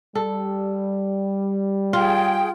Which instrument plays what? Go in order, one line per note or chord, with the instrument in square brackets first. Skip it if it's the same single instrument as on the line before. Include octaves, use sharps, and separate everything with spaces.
[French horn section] G3 [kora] A4
[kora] F4 [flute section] G#4 G5